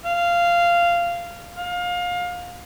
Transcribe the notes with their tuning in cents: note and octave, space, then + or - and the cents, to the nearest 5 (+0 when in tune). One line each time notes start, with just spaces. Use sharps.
F5 -15
F5 +25